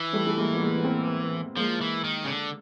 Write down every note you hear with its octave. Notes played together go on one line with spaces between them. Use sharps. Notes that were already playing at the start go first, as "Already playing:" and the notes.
Already playing: E3
G3 A3
A3
G#3 A#3
B3
G#3 A#3
B3
A#3 C4
F3 G#3 A#3
E3
D#3
C#3
D3